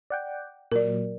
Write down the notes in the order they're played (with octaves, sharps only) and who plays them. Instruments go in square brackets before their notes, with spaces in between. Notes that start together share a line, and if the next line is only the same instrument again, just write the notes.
[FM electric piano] D5 F#5 G5
[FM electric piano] A#2 F#3 [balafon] A#4 D5